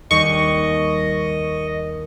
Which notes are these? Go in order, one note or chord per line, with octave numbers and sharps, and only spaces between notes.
D#2 G3 D#5 C#6